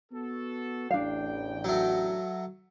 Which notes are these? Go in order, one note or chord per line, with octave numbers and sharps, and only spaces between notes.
B3 F#4 A4
A1 E2 D4 F5 G5
F#3 A3